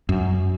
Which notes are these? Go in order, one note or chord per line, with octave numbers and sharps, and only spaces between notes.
F#2